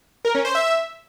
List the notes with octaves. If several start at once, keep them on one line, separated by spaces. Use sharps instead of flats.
A#4
C#4
C5
E5